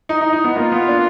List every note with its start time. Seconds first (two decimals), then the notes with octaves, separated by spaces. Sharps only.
0.09 D#4
0.21 D#4
0.33 D#4
0.44 B3
0.56 A#3 F4
0.72 B3
0.88 D4